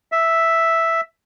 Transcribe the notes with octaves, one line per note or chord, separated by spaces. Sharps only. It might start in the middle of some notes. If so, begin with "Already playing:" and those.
E5